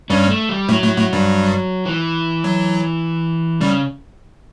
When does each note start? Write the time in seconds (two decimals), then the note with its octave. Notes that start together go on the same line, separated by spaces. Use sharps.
0.10 G2 G3 C#4
0.30 A3
0.49 G3
0.69 A2 F#3 A3
0.83 A2 A3
0.97 A2 A3
1.13 G2 G3
1.85 E3
2.44 F#3
3.61 C#3 G3